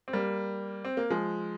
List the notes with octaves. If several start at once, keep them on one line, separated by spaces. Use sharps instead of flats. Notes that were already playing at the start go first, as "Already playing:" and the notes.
C4
G3 A#3
C4
A#3
F3 G#3